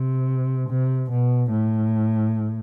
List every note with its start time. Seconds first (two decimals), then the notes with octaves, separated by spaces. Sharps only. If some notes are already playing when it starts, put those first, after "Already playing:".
Already playing: C3
0.70 C3
1.11 B2
1.52 A2